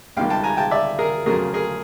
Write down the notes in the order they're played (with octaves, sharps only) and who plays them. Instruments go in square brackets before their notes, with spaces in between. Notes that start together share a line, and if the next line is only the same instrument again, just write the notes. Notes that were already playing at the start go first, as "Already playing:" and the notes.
[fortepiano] C#2 C3 D#3 G3 F5 G5
G5 A5
G#5 A#5
G5 A5
D5 E5
G#4 A#4
F2 C#3 F#3 A3 G#4 A#4
G#4 A#4